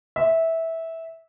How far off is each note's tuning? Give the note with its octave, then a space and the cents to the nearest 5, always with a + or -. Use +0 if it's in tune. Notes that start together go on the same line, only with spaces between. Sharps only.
E5 -15